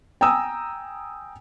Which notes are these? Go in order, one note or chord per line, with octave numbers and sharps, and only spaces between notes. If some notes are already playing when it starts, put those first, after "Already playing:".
G5 G#5 A#5 D#6 E6